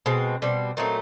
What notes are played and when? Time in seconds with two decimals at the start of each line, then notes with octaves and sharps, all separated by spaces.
0.06 B2 G#3 C4
0.42 B2 G3 C4
0.77 A#2 F#3 A3 C4 D#4